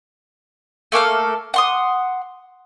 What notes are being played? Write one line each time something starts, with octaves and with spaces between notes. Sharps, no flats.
A3 A#3 A4 F6
F#5 C6 D#6